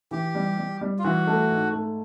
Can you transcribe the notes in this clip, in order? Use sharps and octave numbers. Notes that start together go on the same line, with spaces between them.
E3 G4
G3
G3
G3
F4
E3 F#4
A3
G#2
A3